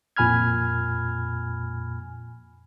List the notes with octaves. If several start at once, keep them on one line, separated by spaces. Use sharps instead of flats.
F2 A#2 G#5 B5 F6 G#6